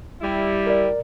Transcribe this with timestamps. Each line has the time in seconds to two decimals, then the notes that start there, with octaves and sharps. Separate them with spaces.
0.21 G3 E4
0.67 A#4 D5